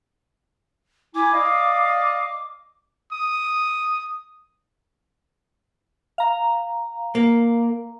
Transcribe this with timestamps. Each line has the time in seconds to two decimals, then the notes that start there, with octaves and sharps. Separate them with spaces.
1.15 E4 G#5 D6
1.33 D5 D#5 F5
3.12 D#6
6.18 F5 A#5
7.15 A#3